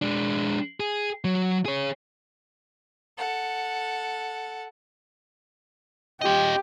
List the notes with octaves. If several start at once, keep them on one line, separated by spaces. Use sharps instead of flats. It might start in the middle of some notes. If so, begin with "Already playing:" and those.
G#3 D4
G#4
F#3
G#4 C#5
A4 F#5
F4 G4 D#5